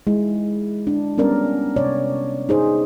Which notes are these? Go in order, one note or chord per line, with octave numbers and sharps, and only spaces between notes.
G#3 E4
D4
G3 B3 C#4 A#4 D5
C3 C#5 D5
D#4 G#4 C5